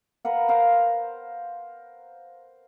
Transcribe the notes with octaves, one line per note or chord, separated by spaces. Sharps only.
A#4 B4 F5 F#5
C5 F5 A#5